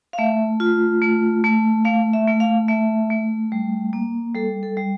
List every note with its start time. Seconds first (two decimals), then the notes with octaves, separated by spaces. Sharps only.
0.13 F5
0.18 A3 E5
0.60 F4
1.02 A3
1.44 A3
1.85 A3 F5
2.13 E5
2.27 A3
2.40 F5
2.68 A3 E5
3.10 A3
3.52 G3
3.93 A#3
4.35 G3 A4
4.63 A4
4.77 G3